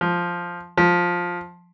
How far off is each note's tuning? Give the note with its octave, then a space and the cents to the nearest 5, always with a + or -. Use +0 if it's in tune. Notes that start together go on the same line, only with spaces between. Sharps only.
F3 +0
F3 +10